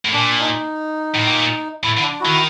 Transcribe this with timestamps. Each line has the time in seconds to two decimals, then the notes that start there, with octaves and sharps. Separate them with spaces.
0.05 A2
0.13 A#2 D4
0.41 D#4
1.14 A2
1.26 A#2
1.84 A2 E4
1.97 D3
2.02 D4
2.20 D#3 E4 F#4